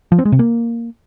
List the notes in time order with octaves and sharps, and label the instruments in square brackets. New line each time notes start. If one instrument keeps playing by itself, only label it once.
[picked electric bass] F3
C4
G#3
C3
A#3